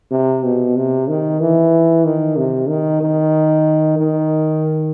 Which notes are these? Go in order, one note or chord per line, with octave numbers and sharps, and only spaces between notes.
C3
B2
C3
D#3
E3
D#3
C3
D#3
D#3
D#3